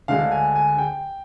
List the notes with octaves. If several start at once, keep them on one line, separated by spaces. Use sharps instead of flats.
D2 D3 G#3 D4 F5
G#5
G#5
G5